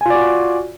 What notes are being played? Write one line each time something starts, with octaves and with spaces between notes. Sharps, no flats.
F4 F#4 D5 G#5